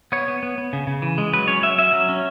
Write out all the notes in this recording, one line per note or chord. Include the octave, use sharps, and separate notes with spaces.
B3 C#5
B3
B3
B3
C#3
C#3
E3
G#3
F#3 B4
C#4 C#5
F#3 E5
C#4 E5
F#3
C#4